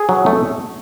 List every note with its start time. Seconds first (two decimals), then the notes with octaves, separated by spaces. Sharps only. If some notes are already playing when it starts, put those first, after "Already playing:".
Already playing: G#4
0.09 F#3
0.26 A3